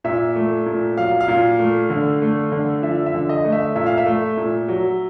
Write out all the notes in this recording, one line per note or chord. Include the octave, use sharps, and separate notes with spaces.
A#2 E5
A3
A#2
F#3 F5
F5
A#2
A3
D3
A3
D3
F3 E5
E5
D3
D#5
A3
E5
A#2 E5
F5
E5
A3
A#2
F#3